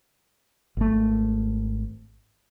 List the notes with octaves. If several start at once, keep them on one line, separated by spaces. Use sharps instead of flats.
G#1 A3